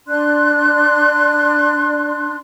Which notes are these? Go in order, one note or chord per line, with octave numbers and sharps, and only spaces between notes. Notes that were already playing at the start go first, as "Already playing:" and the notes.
D4 D5 C6 F#6